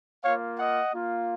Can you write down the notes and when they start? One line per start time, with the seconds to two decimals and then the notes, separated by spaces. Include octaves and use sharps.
0.23 A#3 F4 C#5 F5
0.59 D#5 F#5
0.93 A#3 F4